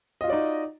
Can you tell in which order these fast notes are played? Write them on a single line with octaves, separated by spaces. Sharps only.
D#5 F4 F#4 D5 D#4